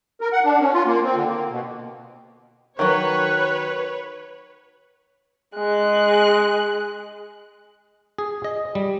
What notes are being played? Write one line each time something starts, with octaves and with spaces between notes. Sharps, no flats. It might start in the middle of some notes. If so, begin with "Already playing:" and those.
A#4
F#5
D4
C#4
F4
A#3
C4
D3
A#3
B2
D#3 F#3 B4 C#5 F#6
G#3 F#6
G#4
D#5
G3